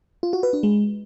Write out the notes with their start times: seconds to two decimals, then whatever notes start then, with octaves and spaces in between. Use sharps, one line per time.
0.23 F4
0.33 F#4
0.43 B4
0.53 D4
0.63 G#3